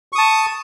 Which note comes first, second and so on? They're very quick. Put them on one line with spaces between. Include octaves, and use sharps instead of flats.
C#6 D#6 A5